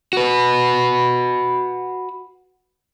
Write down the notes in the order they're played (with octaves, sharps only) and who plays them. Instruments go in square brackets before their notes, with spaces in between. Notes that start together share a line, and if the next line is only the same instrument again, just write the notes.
[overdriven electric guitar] F#4 B4